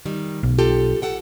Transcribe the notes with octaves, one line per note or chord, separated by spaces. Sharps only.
D#3 G3
B1
F4 G4 A4
A4 F#5 G5